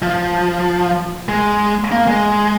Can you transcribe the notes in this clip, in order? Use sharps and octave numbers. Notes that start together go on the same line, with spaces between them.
F3
G#3
A#3
G#3